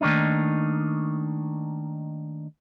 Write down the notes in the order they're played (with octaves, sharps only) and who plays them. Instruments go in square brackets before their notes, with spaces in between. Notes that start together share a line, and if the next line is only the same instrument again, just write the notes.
[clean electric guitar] D#3 A3 A#3 D4 D#4